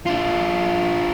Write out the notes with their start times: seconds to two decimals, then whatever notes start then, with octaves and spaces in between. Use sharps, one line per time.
0.06 D4 F4